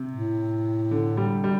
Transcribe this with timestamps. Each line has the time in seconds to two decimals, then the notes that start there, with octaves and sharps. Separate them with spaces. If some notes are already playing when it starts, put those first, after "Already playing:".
Already playing: C3
0.12 A2
0.91 D3
1.17 G3
1.44 G3